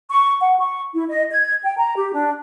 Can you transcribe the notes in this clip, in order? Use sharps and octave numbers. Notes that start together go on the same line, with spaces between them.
C#6
F#5
C#6
E4
D#5
G#6
G5
A#5
G4
D4